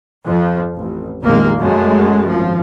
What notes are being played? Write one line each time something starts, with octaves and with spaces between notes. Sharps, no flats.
F2 F3
A1
F1 A#1 C3 D#3 G#3 A#3
F#2 G#3 A3
G#1 F3